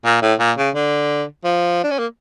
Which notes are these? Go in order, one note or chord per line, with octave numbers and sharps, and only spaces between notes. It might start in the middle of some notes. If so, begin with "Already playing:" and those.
A#2
A2
A#2
C#3
D3
F3
D4
C#4
A#3